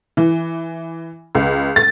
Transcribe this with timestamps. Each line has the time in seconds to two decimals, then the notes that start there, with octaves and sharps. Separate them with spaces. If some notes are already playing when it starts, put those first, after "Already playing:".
0.17 E3
1.35 C#2
1.76 A6